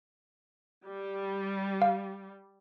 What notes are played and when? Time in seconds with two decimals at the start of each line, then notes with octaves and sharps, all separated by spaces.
0.86 G3
1.82 F5